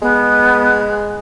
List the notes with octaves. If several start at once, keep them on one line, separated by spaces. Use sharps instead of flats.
G#3 B3